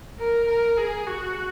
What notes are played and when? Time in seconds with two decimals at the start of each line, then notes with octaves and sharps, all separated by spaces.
0.19 A#4
0.48 A#4
0.78 G#4
1.07 F#4